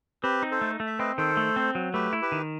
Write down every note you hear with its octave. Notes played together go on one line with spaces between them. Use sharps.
C4 G4 B4
D#4
A4 C5
A3
A3
E5
C4 B4 D#5
D#3 A4 C5
A3
C4
F#3
A3 G4 B4
E4
G4 B4
D#3